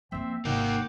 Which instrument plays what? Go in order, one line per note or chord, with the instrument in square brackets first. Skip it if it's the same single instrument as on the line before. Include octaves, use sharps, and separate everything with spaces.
[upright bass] F3 A#3 [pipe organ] C4 E5
[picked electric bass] G#1 [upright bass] C3 [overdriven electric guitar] A#3 D#4 [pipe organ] F#5 G5 D6